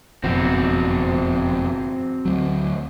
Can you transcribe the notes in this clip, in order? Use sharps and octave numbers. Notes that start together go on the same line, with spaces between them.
F#1 F2 B2 C4 F#4
D2 F#3